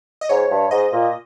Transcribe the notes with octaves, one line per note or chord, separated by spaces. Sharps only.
D#5
G#2 C#5
G2
G#2 D#5
A#2